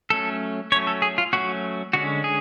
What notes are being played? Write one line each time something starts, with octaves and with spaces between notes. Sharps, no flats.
F#3 A3 C#4 A4
F#3 A3 C#4 C#5
A4
G#4
F4
F#3 A3 C#4 F#4
D3 G#3 C#4 F#4
G#4